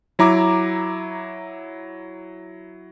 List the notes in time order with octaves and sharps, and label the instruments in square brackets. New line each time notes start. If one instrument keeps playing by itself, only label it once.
[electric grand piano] F#3 E4 A#5 D6